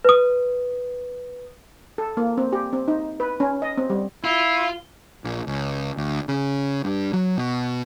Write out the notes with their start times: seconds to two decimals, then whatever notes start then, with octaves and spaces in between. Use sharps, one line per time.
0.05 B4 D#6
1.98 A4
2.17 A#3
2.38 C4
2.53 G4
2.73 C4
2.88 D#4
3.20 B4
3.40 C#4
3.62 D#5
3.77 C4
3.90 G3
4.24 E4 F4
5.24 A#1
5.47 C#2
5.97 D2
6.28 C#3
6.84 G2
7.13 F#3
7.37 B2